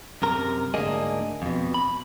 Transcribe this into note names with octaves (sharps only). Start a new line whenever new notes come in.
F#2 C3 A#4 A#5
D2 G#2 A#3 D4 G#4 D#5
F2 B2
B5